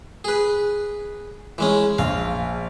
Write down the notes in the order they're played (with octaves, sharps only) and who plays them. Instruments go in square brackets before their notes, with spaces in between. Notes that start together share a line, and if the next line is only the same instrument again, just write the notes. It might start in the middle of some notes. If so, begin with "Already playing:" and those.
[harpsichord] G#4 B4
E3 G#3 C#4
[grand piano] A#1 [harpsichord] F5